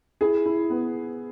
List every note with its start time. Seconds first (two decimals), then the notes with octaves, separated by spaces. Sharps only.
0.21 E4 G#4
0.46 E4
0.70 B3